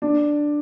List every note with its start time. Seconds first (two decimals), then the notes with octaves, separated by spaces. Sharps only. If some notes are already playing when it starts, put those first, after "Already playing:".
0.02 D4